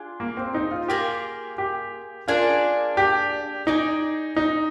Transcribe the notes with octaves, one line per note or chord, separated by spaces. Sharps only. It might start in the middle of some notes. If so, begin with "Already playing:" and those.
Already playing: D4 F4 G#4
A#3
C4
D#4
F4
A#3 F4 G4 G#4
G4
A#3 D4 F4 G#4 D5
G4
D#4 G#4 D5 G#5
D#4